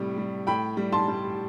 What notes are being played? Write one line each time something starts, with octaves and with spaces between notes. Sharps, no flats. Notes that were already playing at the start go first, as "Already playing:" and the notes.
Already playing: A2 C3 G3
G3
A2 G5 B5
G3
A5 C6
G3